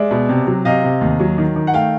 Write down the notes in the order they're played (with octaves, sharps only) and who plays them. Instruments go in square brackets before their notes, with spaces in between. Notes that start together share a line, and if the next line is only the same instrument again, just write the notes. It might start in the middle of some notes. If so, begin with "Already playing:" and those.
Already playing: [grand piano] G#3 D5 E5
B2
C3
F#3
C3 D#5 F5
C3
D#2
F#3
D#3
D#3
F#5
A3 F5 G5